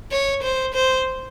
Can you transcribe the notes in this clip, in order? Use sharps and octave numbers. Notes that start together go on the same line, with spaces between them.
C#5
C5
C5